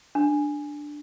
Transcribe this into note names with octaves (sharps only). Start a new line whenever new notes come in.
D4